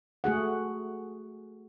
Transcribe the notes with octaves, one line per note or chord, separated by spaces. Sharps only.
A3 F#4 G#4 F#5